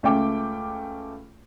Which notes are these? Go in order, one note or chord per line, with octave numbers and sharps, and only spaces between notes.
C#2 A3 C#4 G5 D6